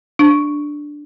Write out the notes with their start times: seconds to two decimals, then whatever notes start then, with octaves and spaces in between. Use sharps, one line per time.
0.19 D4